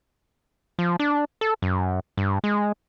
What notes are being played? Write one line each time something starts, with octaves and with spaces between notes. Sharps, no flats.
F3
D4
A4
F#2
G2
G#3